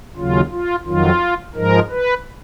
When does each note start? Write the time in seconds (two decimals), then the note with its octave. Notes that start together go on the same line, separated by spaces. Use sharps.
0.17 D#2 C#3 F#3 F4
0.52 F4
0.86 F2 D#3 F#3 F4
1.55 G#2 F3 G#3 A#4
1.90 B4